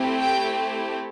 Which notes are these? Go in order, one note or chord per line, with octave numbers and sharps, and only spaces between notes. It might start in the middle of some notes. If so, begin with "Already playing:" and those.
Already playing: A3 C4 E4 G4
G5